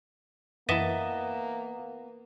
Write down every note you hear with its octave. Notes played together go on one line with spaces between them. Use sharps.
F#2 E3 A#3 B3 E4 D#5 E5 A5